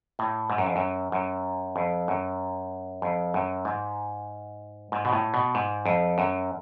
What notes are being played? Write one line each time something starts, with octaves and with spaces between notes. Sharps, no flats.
A2
G#2
F#2
F2
F#2
F#2
F2
F#2
F2
F#2
G#2
G#2
B2
A2
B2
G#2
F2
F#2